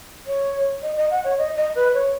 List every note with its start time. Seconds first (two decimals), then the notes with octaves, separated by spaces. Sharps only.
0.27 C#5
0.82 D#5
0.96 D#5
1.10 F#5
1.24 C#5
1.38 D#5
1.56 D#5
1.75 B4
1.94 C#5